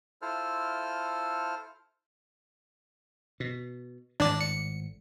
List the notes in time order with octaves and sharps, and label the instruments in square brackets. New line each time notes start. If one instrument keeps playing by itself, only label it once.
[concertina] E4 F4 A4 C5 F6
[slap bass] B2
[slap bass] G#1 A2 [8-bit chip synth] D4 D5
[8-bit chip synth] C#7